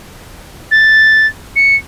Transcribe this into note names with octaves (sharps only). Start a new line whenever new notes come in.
A6
C#7